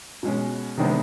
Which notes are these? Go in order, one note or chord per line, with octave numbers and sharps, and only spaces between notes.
B2 G#3 C#4
C3 D#3 G#3 B3 D4